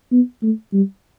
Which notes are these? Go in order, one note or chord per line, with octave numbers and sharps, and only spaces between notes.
B3
A3
G3